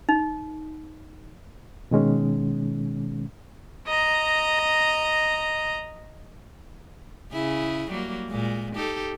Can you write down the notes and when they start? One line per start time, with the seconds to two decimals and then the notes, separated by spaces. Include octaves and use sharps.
0.09 D#4
1.91 B2 D#3 G#3 C#4
3.87 D#5 A#5
7.32 C#3 E4 G#4
7.90 F#3 G3 A#3
8.30 A#2 G#3
8.76 D#4 G4 A4